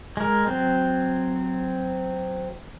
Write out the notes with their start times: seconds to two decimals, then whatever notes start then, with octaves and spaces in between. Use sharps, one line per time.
0.17 G#3 A#4
0.46 F#3 C4